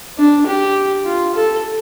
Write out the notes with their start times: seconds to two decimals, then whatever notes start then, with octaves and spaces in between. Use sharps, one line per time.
0.18 D4
0.47 G4
1.05 F4
1.35 A4